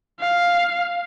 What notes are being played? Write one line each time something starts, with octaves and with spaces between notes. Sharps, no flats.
F5